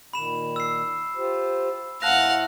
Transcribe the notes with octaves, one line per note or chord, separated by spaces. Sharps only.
A#2 D#3 B5 E7
E6 C7
F4 G4 C5
A2 A3 F5 F#5 A5 F#6 A#6